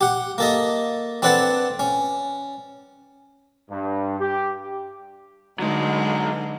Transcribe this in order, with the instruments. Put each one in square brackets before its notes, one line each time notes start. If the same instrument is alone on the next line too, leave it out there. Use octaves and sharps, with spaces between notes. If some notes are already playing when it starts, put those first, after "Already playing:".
[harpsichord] G4 F#5
A#3 A4 D#5
C4 D4 A4 B4 F#5 A5
C#4
[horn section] G2
G4
[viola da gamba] D3 G#3 [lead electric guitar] F#3 D#4